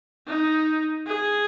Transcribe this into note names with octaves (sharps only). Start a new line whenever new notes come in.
D#4
G#4